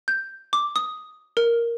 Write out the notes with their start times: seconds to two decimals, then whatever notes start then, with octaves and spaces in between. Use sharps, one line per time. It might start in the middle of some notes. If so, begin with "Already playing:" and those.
0.08 G6
0.53 D6
0.76 D#6
1.37 A#4